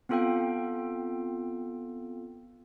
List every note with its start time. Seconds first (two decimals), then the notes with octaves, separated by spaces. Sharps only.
0.09 B3 C4 F4 A4 F5 G5